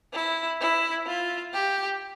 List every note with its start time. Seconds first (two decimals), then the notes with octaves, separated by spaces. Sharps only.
0.14 E4
0.60 E4
1.06 F4
1.53 G4